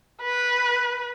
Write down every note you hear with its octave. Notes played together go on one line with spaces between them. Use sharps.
B4